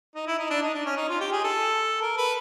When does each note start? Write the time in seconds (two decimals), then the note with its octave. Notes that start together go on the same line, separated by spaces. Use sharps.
0.15 D#4
0.27 E4
0.39 D#4
0.50 D4
0.62 D#4
0.74 D4
0.86 C#4
0.97 D#4
1.09 F4
1.21 G4
1.32 G#4
1.44 A4
2.02 A#4
2.17 B4